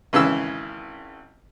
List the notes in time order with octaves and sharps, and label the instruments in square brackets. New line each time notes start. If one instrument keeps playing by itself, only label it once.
[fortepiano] G#1 C#3 E3 E6